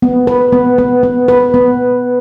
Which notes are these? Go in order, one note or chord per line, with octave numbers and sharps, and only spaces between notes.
B3
B4
B3
B3
B3
B4
B3